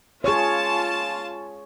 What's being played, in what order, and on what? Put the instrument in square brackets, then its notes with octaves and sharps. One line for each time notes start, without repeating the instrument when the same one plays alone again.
[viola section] F4 A5 [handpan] G#4 C#5